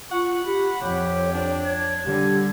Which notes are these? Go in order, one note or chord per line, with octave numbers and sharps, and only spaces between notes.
F4 F#5 C#6
G4 B5
F2 G4 C#5
D4
G#6
D3 G3 G4